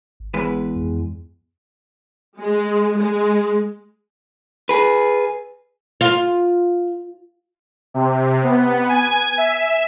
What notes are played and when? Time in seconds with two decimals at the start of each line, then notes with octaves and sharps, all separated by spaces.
0.20 G#1
0.34 E2 G#3 B4
0.76 F2
2.38 G#3
2.97 G#3
4.69 G#4 B4
6.01 F4
7.94 C3
8.43 B3
8.89 G#5
9.38 E5